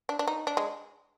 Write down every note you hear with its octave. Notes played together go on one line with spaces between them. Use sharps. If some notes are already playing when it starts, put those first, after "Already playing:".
D4
D4
D#4
D4
G#3